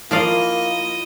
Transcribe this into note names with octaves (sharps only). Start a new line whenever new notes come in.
F3 A#3 E4 F4 D5 D#5 F5